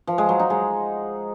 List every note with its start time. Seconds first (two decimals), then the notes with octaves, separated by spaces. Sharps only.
0.07 F3
0.18 G#3
0.29 F#3
0.39 D#4
0.50 G#3